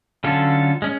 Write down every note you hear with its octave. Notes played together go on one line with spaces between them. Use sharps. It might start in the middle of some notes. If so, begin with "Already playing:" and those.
D3 F#3 C#4 F4 A4
G#3 C#4